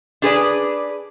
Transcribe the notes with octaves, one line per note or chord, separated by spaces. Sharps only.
D4 G#4 B4 D5